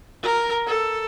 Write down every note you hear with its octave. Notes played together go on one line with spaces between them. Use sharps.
A#4
A4